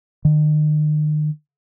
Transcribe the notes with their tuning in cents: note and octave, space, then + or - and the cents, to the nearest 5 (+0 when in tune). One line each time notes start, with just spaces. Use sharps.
D#3 -40